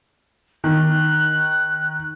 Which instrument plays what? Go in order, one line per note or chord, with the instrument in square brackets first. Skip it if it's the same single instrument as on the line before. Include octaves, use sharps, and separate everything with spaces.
[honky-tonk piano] D#3 [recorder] F#6